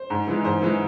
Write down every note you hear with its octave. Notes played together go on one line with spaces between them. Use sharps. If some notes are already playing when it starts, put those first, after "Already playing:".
Already playing: C5
G#2
E3 G#3
G#2 C5
E3 G#3